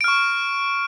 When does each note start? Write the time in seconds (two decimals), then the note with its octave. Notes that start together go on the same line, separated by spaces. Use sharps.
0.01 D7
0.04 F6
0.08 C#6